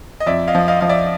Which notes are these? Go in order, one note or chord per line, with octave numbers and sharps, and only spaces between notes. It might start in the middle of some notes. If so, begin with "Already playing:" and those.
D#5
F2 D5 E5
D#5 F5
F3
D#5 F5
F3 F5
D5 E5